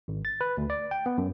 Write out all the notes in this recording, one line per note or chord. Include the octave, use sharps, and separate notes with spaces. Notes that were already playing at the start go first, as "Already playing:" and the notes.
G#1
A6
B4
D2
D5
G5
B3
F#2